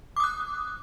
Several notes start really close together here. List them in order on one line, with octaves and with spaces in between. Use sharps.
D6 D#6 F#6